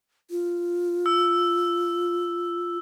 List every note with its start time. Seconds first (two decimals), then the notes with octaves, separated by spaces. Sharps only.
0.31 F4
1.06 E6